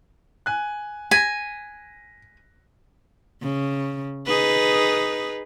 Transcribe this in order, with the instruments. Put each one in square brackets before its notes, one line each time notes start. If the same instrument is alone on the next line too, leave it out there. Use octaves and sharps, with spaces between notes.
[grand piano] G#5 F#6
[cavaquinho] G#5 [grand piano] A#6 B6
[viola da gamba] C#3
D#4 G#4 B4